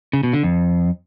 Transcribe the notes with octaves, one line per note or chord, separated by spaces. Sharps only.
C#3
B2
D3
F2